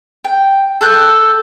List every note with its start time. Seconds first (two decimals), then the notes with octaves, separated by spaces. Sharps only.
0.25 G5
0.81 A4 F#6 G6